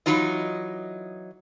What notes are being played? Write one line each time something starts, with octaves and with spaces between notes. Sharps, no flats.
E3 F#3 D#4 F4 D#5